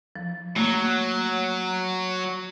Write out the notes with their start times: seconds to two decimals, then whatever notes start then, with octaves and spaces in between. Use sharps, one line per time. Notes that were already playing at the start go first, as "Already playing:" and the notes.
0.16 F3
0.56 F#3 A3 A#3